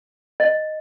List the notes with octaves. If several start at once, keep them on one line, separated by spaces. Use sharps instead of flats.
D#5